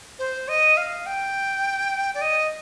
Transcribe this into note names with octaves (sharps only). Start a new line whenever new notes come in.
C5
D#5
F5
G5
D5
D#5